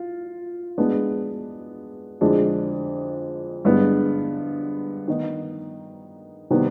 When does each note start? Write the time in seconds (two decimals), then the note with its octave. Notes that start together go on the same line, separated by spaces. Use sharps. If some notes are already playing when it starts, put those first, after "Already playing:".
Already playing: F4
0.78 G#3 B3 D4
2.21 F2 D3 G#3 D4 G#4
3.65 G2 D3 G#3 B3
5.08 D#3 B3 D#4
6.50 C3 D#3 G3 B3